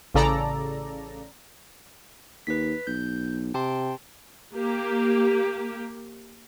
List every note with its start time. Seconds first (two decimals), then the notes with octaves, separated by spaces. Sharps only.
0.14 A1 C#3 A4 D5 A#5
2.47 D#2 B4 B6
2.87 B1 G6
3.54 C3 G5 A5 C6
4.54 A#3 G4